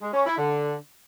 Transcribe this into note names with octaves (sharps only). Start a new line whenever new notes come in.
G#3
C#4
E4
D3